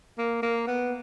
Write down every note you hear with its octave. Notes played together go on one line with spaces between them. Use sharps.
A#3
A#3
B3